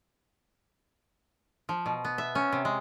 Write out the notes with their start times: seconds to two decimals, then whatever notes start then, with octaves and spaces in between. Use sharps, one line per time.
1.69 F3
1.86 B2
2.05 B3
2.18 E5
2.35 C#4
2.52 C3
2.65 G#3